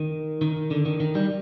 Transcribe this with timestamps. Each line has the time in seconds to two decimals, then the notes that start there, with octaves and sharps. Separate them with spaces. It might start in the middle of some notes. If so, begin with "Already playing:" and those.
Already playing: D#3
0.41 D#3
0.71 D3
0.86 D#3
1.00 D#3
1.15 G3